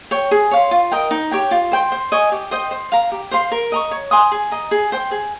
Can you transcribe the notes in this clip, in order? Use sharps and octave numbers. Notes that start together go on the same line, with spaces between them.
C#5 G5
G#4
C#5 F5 C6
F4
A#4 D#5 G5
D#4
G4 C#5 G5
F4
C5 G5 C6
C5
D#5 G#5 C#6
G4
C5 D#5 G5
C5
F5 A#5
G4
C5 F5 C6
A#4
D#5 A#5 C#6
C#5
G#5 C6 D#6
G#4
D#5 A#5
G#4
C5 G5
G#4